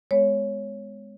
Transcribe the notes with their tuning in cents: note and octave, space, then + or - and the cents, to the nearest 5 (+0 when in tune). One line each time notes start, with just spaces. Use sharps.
G#3 +0 B3 +25 C#5 +0